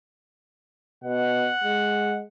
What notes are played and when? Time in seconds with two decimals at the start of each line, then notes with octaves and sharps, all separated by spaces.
1.04 B2 F#5
1.63 G#3